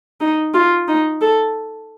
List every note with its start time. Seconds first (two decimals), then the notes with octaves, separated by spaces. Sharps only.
0.21 D#4
0.54 F4
0.88 D#4
1.21 A4